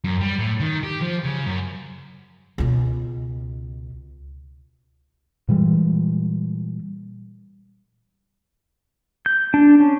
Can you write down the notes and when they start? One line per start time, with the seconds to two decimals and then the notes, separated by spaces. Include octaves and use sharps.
0.04 F#2
0.21 G3
0.39 A2
0.60 D#3
0.83 G4
1.01 F3
1.24 C#3
1.46 F#2
2.58 C#2 B2
5.49 A#2 E3 G3 G#3
9.26 G6
9.54 D4
9.80 C#4